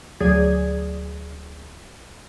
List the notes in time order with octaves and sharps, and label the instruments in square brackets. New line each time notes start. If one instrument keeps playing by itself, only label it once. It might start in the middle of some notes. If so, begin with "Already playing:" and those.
[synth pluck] D2 F#3 G#4 D5 G#6